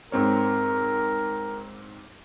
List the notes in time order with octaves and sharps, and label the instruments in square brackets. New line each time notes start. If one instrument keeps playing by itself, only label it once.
[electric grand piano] G#2 C4 C#5 [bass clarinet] A#4